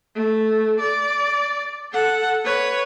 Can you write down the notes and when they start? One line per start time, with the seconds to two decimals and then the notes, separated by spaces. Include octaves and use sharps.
0.15 A3
0.80 D5
1.92 A4 F#5
2.44 B4 C#5